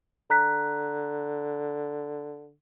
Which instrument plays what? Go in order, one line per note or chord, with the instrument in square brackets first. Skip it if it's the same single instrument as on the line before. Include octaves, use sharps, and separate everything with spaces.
[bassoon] D3 [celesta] A#5 F#6 B6